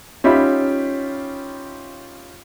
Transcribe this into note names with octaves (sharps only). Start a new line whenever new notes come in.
C#4 D#4 F4 G4 E5 B5